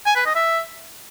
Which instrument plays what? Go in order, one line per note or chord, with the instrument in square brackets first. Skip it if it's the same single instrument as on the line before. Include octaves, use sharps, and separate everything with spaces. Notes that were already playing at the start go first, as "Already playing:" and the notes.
[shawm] G#5
B4
D#5
E5